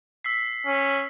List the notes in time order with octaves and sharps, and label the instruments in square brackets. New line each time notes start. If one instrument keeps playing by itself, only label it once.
[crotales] E6 B6 C7
[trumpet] C#4